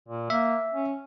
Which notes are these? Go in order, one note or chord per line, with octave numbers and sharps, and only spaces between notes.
A#2
A#3 E5
C#4